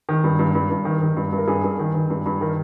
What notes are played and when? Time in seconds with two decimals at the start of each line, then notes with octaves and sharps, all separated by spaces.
0.09 D#3
0.24 G2
0.39 G2
0.55 G2
0.70 G2
0.85 D#3
1.01 D#3
1.17 G2
1.32 G2
1.38 A#4
1.47 G2 G#4
1.63 G2
1.79 D#3
1.95 D#3
2.10 G2
2.26 G2
2.41 D#3 A#4